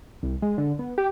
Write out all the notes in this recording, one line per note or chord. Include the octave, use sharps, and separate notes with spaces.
C2
G#3
D3
B3
G4